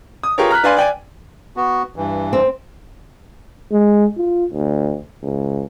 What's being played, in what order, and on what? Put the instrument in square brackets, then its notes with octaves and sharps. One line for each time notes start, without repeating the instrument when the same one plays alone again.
[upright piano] D#6
F4 G4 G#4 A#4 B4 C#5
A#5 F6 F#6 B6
D4 B4 D5 F5 G#5 C6
D5 G5 G#5
[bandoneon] B3 F#4
G2 E3
[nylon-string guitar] C4
[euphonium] G#3
F4
D2
C#2